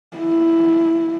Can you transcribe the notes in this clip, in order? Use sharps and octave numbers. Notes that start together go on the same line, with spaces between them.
E4